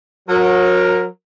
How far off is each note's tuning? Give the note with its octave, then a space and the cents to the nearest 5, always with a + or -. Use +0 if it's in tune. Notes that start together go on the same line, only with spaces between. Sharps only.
F#3 -30 A#4 +0